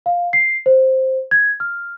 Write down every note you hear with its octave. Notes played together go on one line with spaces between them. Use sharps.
F5
C7
C5
G#6
F6